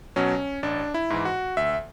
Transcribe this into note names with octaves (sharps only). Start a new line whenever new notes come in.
B2 F#3 C#4
A1 D4
E4
G#2 E3
F#4
D2 E5